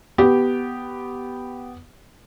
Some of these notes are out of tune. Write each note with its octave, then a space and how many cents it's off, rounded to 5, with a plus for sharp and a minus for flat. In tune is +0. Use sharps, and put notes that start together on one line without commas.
B3 +0 G4 -10